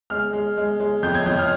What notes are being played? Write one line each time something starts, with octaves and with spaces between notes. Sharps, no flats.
G#3 F6
G#3
G#3
G#3
F2 G6
G#6
F2 G6
F6